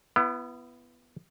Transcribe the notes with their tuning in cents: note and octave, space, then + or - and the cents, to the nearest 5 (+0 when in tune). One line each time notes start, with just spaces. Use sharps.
B3 +0 E4 +35